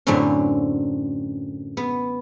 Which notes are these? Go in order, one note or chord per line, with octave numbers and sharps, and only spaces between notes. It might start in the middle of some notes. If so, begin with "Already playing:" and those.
F#2 A2 D3 C4 C#4
B3